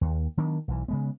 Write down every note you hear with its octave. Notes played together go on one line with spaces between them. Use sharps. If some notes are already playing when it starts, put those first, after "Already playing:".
D#2
D#3 F#3 B3 D4
B1 E3
C#3 G#3 B3